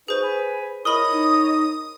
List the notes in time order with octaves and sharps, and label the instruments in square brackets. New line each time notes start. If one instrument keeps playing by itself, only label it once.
[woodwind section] D#4 F#4 [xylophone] G#4 C5 [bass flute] B4
[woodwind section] G#5 B5
[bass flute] E4 [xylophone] A#4 B5 [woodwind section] C#5 D#5 [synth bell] D#6
[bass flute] D#4